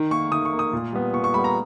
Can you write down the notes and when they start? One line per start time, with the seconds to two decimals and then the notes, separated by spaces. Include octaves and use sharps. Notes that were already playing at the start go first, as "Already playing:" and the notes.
Already playing: D#3
0.11 A#3 C#6
0.32 D#3 D#6
0.45 C#6
0.53 A#3
0.59 D#6
0.73 A#2
0.93 G3 B3
1.14 A#2 C#6
1.24 C#6
1.34 G3 B5
1.39 B3
1.44 A#5